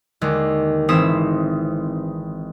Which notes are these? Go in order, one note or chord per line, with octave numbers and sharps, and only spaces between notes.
D#2 D3 G#3
G#1 E3 C4 D#6 B6 E7